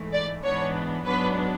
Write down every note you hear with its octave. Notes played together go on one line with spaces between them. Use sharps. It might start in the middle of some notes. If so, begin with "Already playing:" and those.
Already playing: G#2 E3 A3
D5
G#2 E3 B3 D4 C#5
G#2 F#3 B3 D4 B4